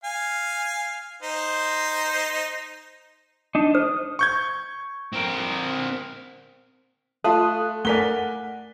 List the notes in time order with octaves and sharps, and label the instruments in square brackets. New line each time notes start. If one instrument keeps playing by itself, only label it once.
[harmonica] F5 G#5
D#4 C5
[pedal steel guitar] D4 D#4
[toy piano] C5 [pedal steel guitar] D#6
[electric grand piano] C#6 G6 G#6
[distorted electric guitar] C4 A#4
[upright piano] A3 [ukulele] F4 F5 A5 [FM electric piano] A4 D#6 F#6
[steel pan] A3 A#4 D5 [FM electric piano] F#5 [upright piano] G#5 B6 G7